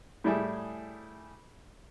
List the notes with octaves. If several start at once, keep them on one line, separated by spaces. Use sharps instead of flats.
A2 G3 E4 G#4